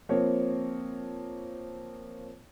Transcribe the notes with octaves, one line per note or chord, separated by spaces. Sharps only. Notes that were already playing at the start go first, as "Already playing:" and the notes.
F3 A#3 C4 C#5